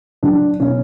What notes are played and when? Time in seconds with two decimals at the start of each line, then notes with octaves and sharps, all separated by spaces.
0.23 F#3 D4
0.60 B2 C#4